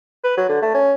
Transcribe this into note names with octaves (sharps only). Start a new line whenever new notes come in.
B4
F#3
D3
A3
C#4